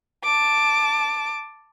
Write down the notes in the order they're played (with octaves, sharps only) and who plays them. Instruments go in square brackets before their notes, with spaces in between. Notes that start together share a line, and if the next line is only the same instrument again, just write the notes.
[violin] A5 D6